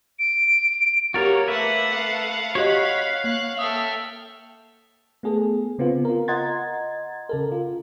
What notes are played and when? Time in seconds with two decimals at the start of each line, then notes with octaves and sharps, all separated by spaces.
0.19 D7
1.14 A#3 F#4 G4 A#4 C#5 A6
1.48 A3 B4 E5 F#5
1.95 F5
2.55 F#4 G4 C#5 D#5 F#5 B5
3.24 A#3 F#6
3.59 A4 E5 G5 D#6 F6
5.23 A3 B3 G#4 A4
5.78 C#3 B3 C4 F4
6.05 F4 A#4
6.28 D#5 F#5 A#5 C6 G#6 A6
7.29 C#3 A4 A#4
7.52 F4